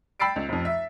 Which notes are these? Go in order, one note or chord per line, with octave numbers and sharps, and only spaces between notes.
G5 B5 E6 A6 C7 D7
C#2
F1 F2
E5